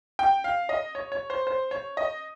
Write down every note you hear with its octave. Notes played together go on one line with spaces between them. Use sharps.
G5
F5
D#5
C#5
C#5
C5
C5
C#5
D#5